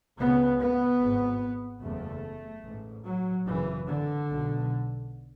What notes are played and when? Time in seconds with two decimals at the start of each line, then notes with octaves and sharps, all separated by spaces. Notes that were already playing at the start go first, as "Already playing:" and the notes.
0.19 C#2 C#3 B3
0.60 B3
1.01 G#1 G#2
1.83 F#1 E2 C#3 A3
2.65 A1 G#2
3.06 F#3
3.47 G#1 F#2 C#3 E3
3.87 D3
4.29 B1 B2